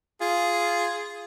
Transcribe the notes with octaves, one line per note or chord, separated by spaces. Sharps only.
F4 G#4